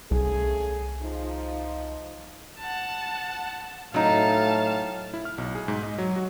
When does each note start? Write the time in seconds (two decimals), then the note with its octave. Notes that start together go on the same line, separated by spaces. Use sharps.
0.11 C2 C#3 A3 G#4
1.02 F3 D#4
2.59 F#5 A5
3.94 A2 F#3 D#4 F5 A5
5.14 E4
5.25 F6
5.38 B1
5.55 G#4
5.68 G#2
5.83 D#5
5.98 F#3
6.16 F#4